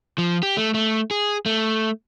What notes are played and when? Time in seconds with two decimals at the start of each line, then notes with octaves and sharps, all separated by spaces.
0.18 F3
0.43 G4
0.57 A3
0.74 A3
1.11 G#4
1.46 A3